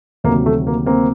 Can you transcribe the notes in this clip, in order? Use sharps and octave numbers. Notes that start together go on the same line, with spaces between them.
D2 C3 D#3 F#3 A#3
A3
A#3
A#3 C4